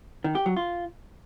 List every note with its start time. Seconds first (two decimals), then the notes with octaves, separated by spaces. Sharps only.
0.24 D#3
0.35 G4
0.46 F#3
0.56 F4